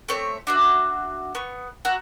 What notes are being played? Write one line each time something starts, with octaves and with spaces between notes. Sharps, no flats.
A3 C4 C#5 E5
D4 F#4 E5
B3 C#6
F#4 E5 A#5